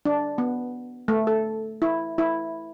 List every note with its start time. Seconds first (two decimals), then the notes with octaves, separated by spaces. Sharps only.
0.05 D4
0.38 B3
1.08 A3
1.27 A4
1.82 E4
2.18 E4